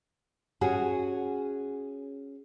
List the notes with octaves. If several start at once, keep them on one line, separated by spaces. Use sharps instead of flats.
C#4 F#4 G#4